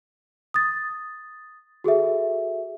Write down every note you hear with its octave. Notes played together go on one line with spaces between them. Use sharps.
D#6 A6
F#4 G#4 A4 E5